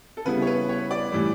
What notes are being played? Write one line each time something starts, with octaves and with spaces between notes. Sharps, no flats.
A4
C#3 G3 B3 E4 B4
C#5
B4
C#5
D5
A2 E3 G3